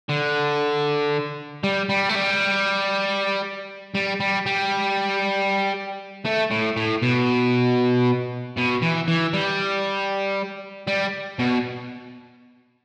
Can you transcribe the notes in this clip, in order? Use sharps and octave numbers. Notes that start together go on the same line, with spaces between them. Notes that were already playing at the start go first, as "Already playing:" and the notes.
D3
G3
G3
A3
G3
G3
G3
G3
A3
A2
A2
B2
B2
E3
E3
G3
G3
B2